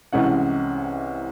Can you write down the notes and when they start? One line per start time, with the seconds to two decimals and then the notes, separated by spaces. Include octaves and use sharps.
0.13 C2 C3 E3 G#3 C#4 F#5